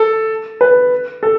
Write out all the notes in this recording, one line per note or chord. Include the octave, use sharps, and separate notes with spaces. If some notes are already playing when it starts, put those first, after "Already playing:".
Already playing: A4
B4
A4